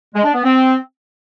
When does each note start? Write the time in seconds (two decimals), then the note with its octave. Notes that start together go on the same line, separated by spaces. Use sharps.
0.14 G#3
0.24 D4
0.34 B3
0.44 C4